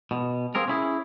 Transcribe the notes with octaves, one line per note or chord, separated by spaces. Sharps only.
B2
A#3 C4 G#4 A#4
C#4 E4 G#4